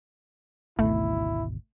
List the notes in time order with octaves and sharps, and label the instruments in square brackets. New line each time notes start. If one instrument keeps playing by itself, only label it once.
[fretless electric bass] G#1 D2 B2 [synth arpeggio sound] A3 [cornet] E4